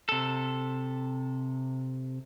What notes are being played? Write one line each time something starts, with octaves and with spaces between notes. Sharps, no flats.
C3 A4